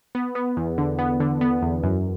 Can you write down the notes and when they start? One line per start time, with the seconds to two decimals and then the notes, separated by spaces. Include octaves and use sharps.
0.15 B3
0.35 B3
0.57 E2
0.78 D3
0.99 B3
1.20 D3
1.41 B3
1.62 E2
1.83 F#2